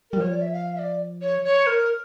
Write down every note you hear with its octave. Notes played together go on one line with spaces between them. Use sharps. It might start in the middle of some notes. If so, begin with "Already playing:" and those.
G3 A#4
F3 C#5
D5
E5
F5
E5
D5
C#5
C#5
A#4